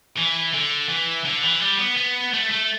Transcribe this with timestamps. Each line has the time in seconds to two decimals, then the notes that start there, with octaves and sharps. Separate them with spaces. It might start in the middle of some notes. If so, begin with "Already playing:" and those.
0.17 E3
0.54 D3
0.89 E3
1.25 D3
1.43 E3
1.61 G3
1.79 B3
1.97 B3
2.34 A3
2.51 A3